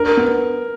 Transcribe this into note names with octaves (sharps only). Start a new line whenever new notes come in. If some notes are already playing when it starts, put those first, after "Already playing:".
Already playing: D4 A#4
B3